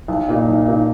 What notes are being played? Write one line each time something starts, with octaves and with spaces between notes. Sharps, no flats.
B1
A#2 A#3 D#4
B1
A#2 A#3 D#4